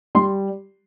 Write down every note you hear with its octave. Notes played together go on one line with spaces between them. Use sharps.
G3 C6